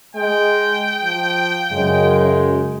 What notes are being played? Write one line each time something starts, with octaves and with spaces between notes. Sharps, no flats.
G#3 G5
F3
F#2 C#3 G#3